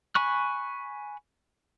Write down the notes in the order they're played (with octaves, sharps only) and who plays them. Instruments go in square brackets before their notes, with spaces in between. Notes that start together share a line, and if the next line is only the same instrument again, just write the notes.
[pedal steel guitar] G#5 B5 C#6 F#6